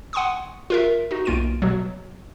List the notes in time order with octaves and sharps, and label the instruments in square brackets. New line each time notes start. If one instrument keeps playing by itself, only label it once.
[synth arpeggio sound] F#5 G#5 C6 C#6 D#6
F4 A#4 E5
D#4 F#4
B1 A#3 F4 D7 D#7
B2 F#3